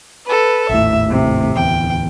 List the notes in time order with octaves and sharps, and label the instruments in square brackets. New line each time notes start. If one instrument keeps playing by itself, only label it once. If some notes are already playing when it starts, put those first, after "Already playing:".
[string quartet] A4 B4
[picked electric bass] G#1 D#2 A2 [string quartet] E5
[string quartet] C3
[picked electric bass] D1 E2 [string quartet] G5